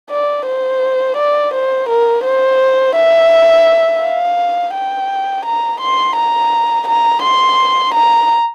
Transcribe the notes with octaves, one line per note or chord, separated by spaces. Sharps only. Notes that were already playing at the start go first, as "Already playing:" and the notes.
D5
C5
D5
C5
A#4
C5
E5
F5
G5
A#5
C6
A#5
A#5
C6
A#5